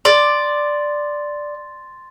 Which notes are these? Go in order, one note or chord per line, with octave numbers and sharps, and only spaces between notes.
D5 C6 A6